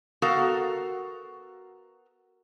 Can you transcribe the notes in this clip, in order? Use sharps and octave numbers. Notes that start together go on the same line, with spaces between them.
B3 F#4 A4 A#4 F5 A#5